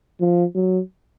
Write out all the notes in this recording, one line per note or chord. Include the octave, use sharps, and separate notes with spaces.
F3
F#3